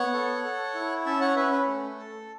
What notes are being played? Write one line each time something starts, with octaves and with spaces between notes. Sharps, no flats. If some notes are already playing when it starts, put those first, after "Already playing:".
Already playing: B3 C#5 F#5
A4
A4
E4
C#4 E5 A5
C#5 F#5
C#4 B4 E5
B4
A3
A4